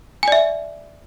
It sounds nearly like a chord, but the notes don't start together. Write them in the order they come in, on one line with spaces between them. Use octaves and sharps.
G#5 D5 E5